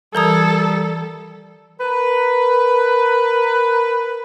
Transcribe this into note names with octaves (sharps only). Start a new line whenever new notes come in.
E3 G3 A4 A#4 A#5 D#6 G#6
A#4 B4